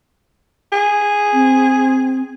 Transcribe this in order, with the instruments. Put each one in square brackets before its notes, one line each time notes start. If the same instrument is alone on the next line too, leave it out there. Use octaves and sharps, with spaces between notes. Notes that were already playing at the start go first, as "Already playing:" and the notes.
[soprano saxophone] G#4
[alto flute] C4